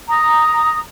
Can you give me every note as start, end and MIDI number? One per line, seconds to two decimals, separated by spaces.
0.08 0.80 82
0.08 0.80 87